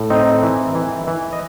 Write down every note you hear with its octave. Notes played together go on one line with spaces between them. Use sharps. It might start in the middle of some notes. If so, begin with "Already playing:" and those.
Already playing: A2
C4 D#4 D#5
E3
E3
E3
D#5